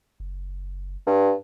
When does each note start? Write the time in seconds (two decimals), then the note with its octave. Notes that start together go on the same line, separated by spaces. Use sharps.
0.20 F#1
1.06 G2